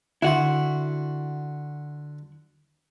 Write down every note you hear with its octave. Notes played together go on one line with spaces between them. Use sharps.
D3 E4 F#4 C6